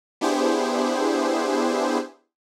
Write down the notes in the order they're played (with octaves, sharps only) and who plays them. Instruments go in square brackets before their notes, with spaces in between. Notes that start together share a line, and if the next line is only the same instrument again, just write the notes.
[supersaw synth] B3 D4 E4 G4 G#4 C5